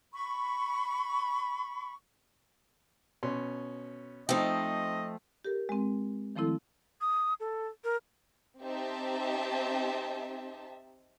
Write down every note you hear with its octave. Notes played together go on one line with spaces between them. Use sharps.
B5 C#6
B2 C#4 C6
F3 A3 C4 D#4 D#5 G5
G4 A4 A#4
G#3 C4
D#3 F3 A3 C4 E4 A4
D#6
A4
A#4
C4 D#4 G4 E5 A5